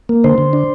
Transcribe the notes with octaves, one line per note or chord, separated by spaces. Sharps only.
A#3
D3 C5
D3
D4